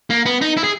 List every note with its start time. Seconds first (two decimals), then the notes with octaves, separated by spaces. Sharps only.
0.10 A#3
0.26 B3
0.41 D#4
0.57 E4
0.64 G#4